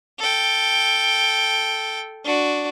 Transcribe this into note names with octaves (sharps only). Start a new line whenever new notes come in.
A4 G5
D4 F#4